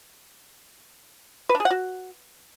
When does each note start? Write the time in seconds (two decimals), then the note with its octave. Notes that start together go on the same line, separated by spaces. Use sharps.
1.49 B4
1.55 D4
1.60 G#4
1.65 F#5
1.70 F#4